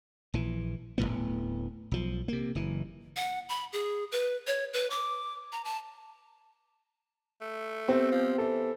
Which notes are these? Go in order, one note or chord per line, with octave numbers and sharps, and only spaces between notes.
A#1 E3
D1 F2 A2 B3
B1 F3
C3 A#3
F#1 E3
F#5
B5
G#4
B4
C#5
B4
D6
A#5
A5
A3
B3 C4 G4 C5
F3
E3 A4